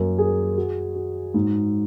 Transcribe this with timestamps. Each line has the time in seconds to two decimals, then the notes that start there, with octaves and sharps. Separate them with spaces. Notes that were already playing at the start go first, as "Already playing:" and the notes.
Already playing: F#2 A#3
0.18 G#4
0.57 F#4
0.96 F#4
1.34 G#2